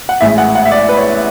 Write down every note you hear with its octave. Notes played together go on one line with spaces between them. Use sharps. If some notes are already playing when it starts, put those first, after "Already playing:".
F#5
A1 A2 E3 G#3 E5
F#5
F#5
E5
D5
B4
C#5